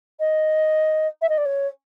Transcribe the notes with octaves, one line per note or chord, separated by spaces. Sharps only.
D#5
E5
D#5
D5
C#5